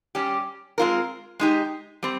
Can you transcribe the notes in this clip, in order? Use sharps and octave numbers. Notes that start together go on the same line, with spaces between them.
G3 C#4 G4
G#3 C4 F4 A#4
G#3 D#4 G4
G3 C4